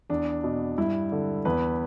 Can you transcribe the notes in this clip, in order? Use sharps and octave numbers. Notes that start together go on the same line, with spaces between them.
E2 D4
B2
G2 E4
D3
E2 B4